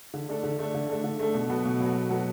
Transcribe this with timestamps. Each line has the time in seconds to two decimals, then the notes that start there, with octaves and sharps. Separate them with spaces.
0.14 D3
0.29 A3 D4 A4
0.43 D3
0.59 A3 D4 A4
0.74 D3
0.90 A3 D4 A4
1.04 D3
1.19 A3 D4 A4
1.34 B2
1.49 F#3 B3 F#4 A4
1.65 B2
1.80 F#3 B3 F#4 A4
1.95 B2
2.10 F#3 B3 F#4 A4